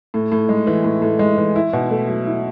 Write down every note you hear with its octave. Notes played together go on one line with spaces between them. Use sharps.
A2
A2
G#3
E3
A2
A2
G#3
E3
E4
B2
A3
F#3
E4